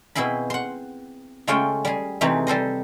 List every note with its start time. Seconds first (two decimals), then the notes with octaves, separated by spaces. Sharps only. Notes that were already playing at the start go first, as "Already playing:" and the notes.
0.15 B2 C4 E4 G#4 B5
0.50 F#5 C6
1.47 C#3 G#3 A3 F4 C#5 G5
1.85 G3 G#4
2.21 C3 E3 G#3 A3 D#4 G4
2.47 G3 A4 C5 D#5